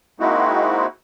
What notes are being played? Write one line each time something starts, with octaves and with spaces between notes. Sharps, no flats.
G#3 A#3 C4 D#4 E4 F#4